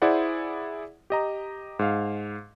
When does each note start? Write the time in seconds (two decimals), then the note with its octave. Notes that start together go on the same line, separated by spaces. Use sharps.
0.02 E4 G#4 C5 D5 F#5
1.10 G4 D#5 A#5
1.79 G#2 F5